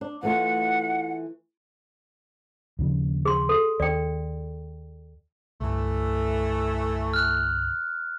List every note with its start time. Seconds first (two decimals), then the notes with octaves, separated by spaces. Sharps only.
0.01 D4
0.23 E3 A3 F4 F#5
2.79 D#2 C#3 F3
3.25 G#4 C6
3.49 A4
3.80 D#2 D5 G5
5.61 G1 C2 E3 A3
7.14 F6 F#6